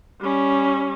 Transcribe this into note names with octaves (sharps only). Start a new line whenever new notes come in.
G3 C#4